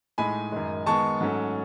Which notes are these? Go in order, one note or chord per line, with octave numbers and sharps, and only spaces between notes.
A2 G#3 D#4 G#5 B5
F#2 D#3 G#3
D#3 G#3 B3 A5 C#6
G#2 F#3 A3 C#4